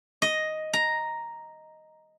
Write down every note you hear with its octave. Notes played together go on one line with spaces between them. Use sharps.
D#5
A#5